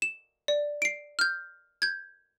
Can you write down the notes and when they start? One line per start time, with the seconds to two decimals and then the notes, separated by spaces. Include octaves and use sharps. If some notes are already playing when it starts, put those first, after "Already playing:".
0.02 E7
0.48 D5
0.82 C7 D7
1.19 F6 G6
1.82 G6 G#6